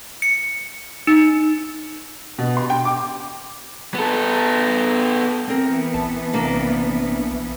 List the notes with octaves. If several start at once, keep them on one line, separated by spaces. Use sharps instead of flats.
C#7
D#4
B2
C6
G5
D6
B3 A4
E3 B3 C4 A#4
A#1 A5
C3 A#3 D4